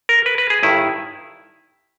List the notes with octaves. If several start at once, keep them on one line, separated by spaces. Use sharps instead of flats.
A#4
B4
B4
G#4
G1 G2 D#3 E4